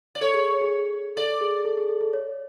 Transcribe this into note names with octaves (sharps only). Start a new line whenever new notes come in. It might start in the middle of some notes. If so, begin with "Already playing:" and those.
D5
A4 C#5
G#4
G#4
A4 D5
G#4
A4
G#4
A4
A4
C#5